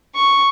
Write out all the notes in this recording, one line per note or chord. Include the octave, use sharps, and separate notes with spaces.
C#6